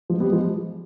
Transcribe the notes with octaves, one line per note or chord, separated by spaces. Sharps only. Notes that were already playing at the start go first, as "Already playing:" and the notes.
F3 G#3
G3 B3
F3 G#3